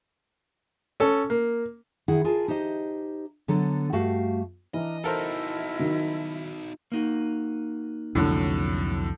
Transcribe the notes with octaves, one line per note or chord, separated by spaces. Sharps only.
C#4 A4
A#3
D#3 E4 G#4 F#5
F4 G#4 A#4 G#5 A5
D#4 G4 C5 D#5
D3 F#3 B3 A4 A#5
G2 A3 F#4 G4 F5
E3 D4 D#5 A#5 F6
D#4 E4 F#4 A4 A#4 C5 D#5 E5
D#3 F#3
A#3 D#4 F#4
C2 F2 A2 D3 F#3